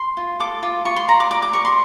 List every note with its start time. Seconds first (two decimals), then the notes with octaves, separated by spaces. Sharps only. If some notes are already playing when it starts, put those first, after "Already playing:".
Already playing: C6
0.17 F4
0.40 A4 D6
0.63 F4
0.85 F4 C#6
0.96 C6
1.08 D5 A#5
1.20 D6
1.31 D5 D6
1.42 D6
1.53 A#4 C#6
1.65 C6